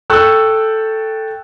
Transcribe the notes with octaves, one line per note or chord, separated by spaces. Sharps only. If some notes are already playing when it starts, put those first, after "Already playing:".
A4 G5 C#6 E6 F#6